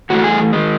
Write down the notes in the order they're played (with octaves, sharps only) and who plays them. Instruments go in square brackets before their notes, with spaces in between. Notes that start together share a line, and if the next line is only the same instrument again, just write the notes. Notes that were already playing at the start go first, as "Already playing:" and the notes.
[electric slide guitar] A2 E3 A3 F#4
G#4
D#3 G#3